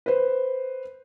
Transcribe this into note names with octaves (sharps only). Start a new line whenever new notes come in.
B4 C5